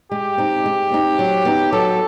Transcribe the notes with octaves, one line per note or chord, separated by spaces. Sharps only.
G#3 G4
C4 D#4
G#3
C4 D#4
F#3
B3 D#4
F#3 A4